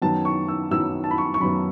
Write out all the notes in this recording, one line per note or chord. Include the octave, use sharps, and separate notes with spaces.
F#2 D#3 F#3 B3 A5
C#6
E6
F#2 D#3 F#3 B3 E6
A5
B5
C#6
C#6
F#2 D#3 F#3 B3 B5